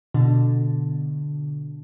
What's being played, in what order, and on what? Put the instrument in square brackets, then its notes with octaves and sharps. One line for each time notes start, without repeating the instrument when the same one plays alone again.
[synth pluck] B2 D3